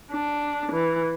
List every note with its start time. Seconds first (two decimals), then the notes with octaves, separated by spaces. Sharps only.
0.12 D4
0.72 E3